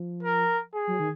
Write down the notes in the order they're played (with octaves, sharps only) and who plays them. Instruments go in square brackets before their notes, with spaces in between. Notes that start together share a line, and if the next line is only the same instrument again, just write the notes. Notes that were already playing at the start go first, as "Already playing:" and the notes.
Already playing: [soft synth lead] F3
[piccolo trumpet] A#4
G#4
[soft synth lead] F#3
D#3